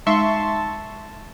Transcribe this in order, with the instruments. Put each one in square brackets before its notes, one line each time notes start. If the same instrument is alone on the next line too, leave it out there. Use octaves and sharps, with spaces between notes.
[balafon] G#3 D#4 [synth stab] E5 C6 C#6 [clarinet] A5